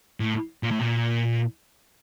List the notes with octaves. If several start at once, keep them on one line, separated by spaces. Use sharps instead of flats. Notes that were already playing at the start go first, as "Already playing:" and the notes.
A2
A#2
A2
A#2